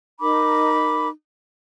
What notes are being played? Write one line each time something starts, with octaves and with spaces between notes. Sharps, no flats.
D#4 A#4 B5 D6